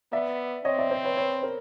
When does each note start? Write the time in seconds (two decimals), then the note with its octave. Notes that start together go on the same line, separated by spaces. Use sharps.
0.12 B3 D5 E5
0.65 C4 C#5 D#5
0.79 D5 E5
0.91 C5 D5
1.04 B4 C#5
1.17 B4 C#5
1.43 A#4 C5